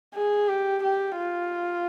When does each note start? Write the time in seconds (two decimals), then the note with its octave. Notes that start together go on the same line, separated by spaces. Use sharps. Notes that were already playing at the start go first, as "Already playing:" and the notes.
0.14 G#4
0.48 G4
0.83 G4
1.18 F4